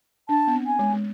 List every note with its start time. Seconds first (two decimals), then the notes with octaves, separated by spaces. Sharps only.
0.29 D4 A5
0.47 B3
0.53 C4
0.66 G#5
0.79 G#3
0.93 G#3